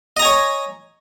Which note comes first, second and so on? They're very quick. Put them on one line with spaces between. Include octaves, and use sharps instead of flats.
D#5 A#5 G#5 C#5